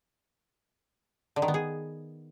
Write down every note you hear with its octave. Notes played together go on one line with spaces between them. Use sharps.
D3
D#3
B3
G#4